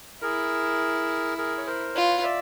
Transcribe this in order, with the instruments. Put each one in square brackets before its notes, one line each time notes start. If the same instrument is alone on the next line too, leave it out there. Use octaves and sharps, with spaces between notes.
[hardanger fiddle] E4 [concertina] G#4 A#4
[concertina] G#4 A#4
C#5
A#4 C5
[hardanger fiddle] F4 [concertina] B4 C#5
[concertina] D5 E5